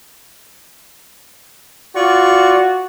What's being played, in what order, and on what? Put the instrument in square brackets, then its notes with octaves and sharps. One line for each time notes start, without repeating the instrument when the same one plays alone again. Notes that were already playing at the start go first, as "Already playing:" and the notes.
[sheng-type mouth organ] F4 D5 C#6 [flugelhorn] F#4